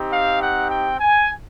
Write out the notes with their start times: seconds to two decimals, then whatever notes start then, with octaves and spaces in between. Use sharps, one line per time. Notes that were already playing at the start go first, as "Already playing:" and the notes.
Already playing: C4 D#4 G4
0.13 F5
0.42 F#5
0.71 G5
1.00 G#5